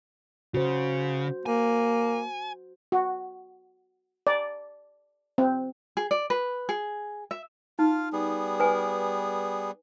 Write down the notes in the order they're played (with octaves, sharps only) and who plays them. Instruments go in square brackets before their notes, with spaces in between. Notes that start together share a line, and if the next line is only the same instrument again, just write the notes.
[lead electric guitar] C#3 [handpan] F#4 C5
[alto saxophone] A#3 [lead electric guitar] G#5
[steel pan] F#4
D5
C4
[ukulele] G#4
D5
B4
G#4
E5
[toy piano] D#4 [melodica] F4 F5
[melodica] G3 B3 G#4
[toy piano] B4 G#5